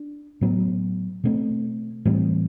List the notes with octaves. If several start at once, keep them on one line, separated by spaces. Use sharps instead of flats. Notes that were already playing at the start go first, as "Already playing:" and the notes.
Already playing: D4
A2 F#3 B3
B2 A3 C4
A2 E3 G3 C4